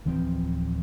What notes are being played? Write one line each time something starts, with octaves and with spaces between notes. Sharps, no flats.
D1 E3 F3 C4